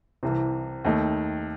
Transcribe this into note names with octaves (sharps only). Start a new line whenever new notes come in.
C2 C3 E3
D#2 D#3 A3 D#4